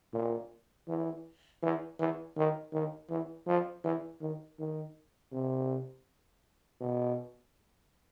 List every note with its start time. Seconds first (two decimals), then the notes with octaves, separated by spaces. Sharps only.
0.13 A#2
0.88 E3
1.63 E3
2.00 E3
2.37 D#3
2.73 D#3
3.10 E3
3.47 F3
3.84 E3
4.21 D#3
4.59 D#3
5.32 C3
6.81 B2